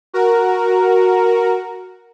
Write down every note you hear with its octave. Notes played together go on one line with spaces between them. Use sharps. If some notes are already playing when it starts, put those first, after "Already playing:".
F#4 A#4